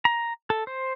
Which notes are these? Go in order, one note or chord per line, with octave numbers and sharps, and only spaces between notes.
A#5
A4
C5